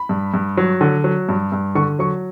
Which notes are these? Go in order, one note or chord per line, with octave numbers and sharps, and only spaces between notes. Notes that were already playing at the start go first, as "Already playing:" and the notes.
Already playing: B5
G2
G2
F#3
D3
F#3
G2
G2
D3 C#6
F#3 C#6